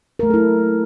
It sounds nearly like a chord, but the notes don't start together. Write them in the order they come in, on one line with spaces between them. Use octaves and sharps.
A#4 A3 F#3 A4 E4